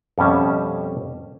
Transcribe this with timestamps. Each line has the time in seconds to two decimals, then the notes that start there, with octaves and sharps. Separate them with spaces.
0.18 F2 B2 G3 C#4 E5 A5